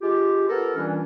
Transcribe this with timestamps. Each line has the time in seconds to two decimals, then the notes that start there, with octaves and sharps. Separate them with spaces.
0.01 G#3 F4 G4
0.48 B3 A4 A#4
0.76 A#2 E3 G3 C#4 D4